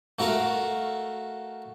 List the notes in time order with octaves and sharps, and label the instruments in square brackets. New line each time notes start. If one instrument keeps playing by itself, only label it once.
[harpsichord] A3 F#4 A#4 F5